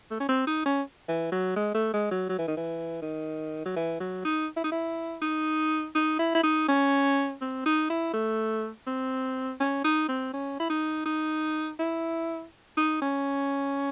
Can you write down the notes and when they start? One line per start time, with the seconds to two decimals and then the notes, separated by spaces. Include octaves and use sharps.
0.11 A3
0.20 C#4
0.29 C4
0.47 D#4
0.66 C#4
1.08 E3
1.32 F#3
1.56 G#3
1.74 A3
1.93 G#3
2.11 F#3
2.29 F#3
2.38 E3
2.48 D#3
2.57 E3
3.02 D#3
3.65 F#3
3.76 E3
4.00 F#3
4.25 D#4
4.57 E4
4.64 D#4
4.72 E4
5.22 D#4
5.95 D#4
6.19 E4
6.35 E4
6.43 D#4
6.68 C#4
7.41 C4
7.66 D#4
7.90 E4
8.13 A3
8.87 C4
9.60 C#4
9.84 D#4
10.09 C4
10.33 C#4
10.60 E4
10.70 D#4
11.05 D#4
11.79 E4
12.77 D#4
13.02 C#4